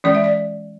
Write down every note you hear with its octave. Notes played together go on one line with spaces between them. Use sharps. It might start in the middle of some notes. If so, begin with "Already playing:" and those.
E3 G#3 C#4 D5
E5
D5